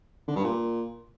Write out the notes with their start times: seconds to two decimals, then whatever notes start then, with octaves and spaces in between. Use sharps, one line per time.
0.28 D3
0.36 G2
0.44 A#2